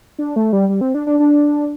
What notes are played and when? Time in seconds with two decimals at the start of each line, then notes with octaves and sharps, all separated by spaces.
0.18 D4
0.36 A3
0.53 G3
0.69 G3
0.81 C4
0.94 D4
1.07 D4
1.19 D4